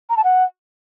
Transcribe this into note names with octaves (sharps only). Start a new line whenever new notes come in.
A#5
A5
F#5